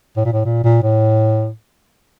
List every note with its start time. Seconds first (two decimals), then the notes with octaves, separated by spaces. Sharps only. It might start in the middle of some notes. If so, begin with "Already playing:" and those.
0.17 A2
0.25 A#2
0.32 A2
0.45 A#2
0.64 A#2
0.83 A2